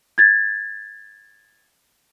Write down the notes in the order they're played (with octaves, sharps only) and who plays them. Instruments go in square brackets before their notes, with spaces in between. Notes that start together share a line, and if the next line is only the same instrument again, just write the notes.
[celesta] G#6 A6